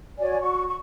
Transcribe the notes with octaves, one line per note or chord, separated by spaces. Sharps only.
F#4 C#5 D5 G#5
F#4 C#6
C#6